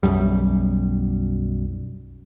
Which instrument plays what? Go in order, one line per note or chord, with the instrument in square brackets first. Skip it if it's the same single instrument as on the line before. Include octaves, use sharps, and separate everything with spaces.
[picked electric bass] B1 F#2 G3